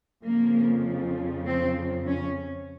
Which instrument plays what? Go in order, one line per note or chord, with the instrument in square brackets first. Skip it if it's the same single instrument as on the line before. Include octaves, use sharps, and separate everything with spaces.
[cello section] F2 C#3 F3 A#3
C4
C#4